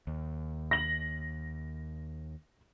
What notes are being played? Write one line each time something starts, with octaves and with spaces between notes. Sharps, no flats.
D#2
A#6 F#7